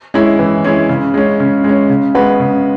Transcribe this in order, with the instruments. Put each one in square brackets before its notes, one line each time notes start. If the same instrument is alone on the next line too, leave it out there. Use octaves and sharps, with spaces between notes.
[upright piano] G#3 C#4 E4
E3
G#3 C#4 E4
C#3
G#3 C#4
C#3
G#3
C#4
C#3
G#3 B3 F#4 B4
C#3